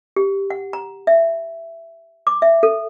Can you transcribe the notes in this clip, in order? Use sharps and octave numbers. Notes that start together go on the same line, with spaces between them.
G4
F#5
A#5
E5
D6
E5
A4